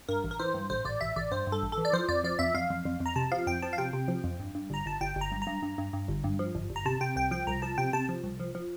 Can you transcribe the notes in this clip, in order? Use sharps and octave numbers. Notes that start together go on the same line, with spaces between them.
G2 A#4
A1
A#4
E3 C5
G2
A1 C5
A1 D5
A1 E5
A1 D5
G2 C5
G2
A4
A1
A4
E3
D5
F3 C5
F2 D5
F3 D5
F2 E5
F2 F5
F2
F2
F2
A#5
C3 A5
F3 F5
F2 G5
F3 A5
F5
C3 G5
C3
F3
F2
G2
G2
G1 A#5
G1 A5
G1 G5
G1
A#5
G2
A#5
G2
G2
G2
G2
G1
G2
F3
G1
G1
A#5
C3 A5
C3 G5
C2 G5
F3 G5
C2 A#5
F3 A5
C3 G5
C3 A5
F3
C2
F3
F3